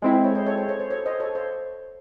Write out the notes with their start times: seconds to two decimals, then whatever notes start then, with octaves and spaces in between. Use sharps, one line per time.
0.02 G#3 C4 E4 A4
0.13 C5
0.24 A4 C#5
0.35 C5 D#5
0.46 A4 C#5
0.58 C5
0.68 A4 C#5
0.80 C5
0.90 A4 C#5
1.05 C5 D#5
1.20 A4 C#5
1.35 C5